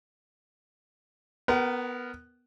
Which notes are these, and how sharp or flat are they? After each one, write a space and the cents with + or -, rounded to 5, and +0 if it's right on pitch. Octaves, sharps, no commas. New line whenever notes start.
B3 +0 A#4 +0 F#5 +45